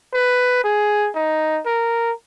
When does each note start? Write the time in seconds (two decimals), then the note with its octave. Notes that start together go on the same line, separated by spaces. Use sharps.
0.14 B4
0.64 G#4
1.15 D#4
1.66 A#4